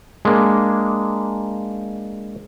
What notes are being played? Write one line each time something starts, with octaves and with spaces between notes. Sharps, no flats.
G#3 A#3 D4